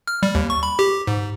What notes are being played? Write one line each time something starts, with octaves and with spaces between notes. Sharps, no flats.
F6
G3
D#2
C#6
B5
G4
G#2